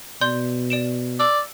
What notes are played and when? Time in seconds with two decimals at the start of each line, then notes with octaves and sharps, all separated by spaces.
0.21 B2 D5 C6 G6
0.70 D5 D7 E7
1.20 D5 E6